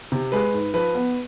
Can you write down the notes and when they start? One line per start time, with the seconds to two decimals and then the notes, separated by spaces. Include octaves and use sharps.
0.12 C3
0.32 G#3 B4
0.53 G#2
0.74 F3 B4
0.95 B3